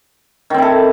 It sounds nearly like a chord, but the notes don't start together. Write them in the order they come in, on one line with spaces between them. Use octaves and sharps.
D#3 C4 E4 A4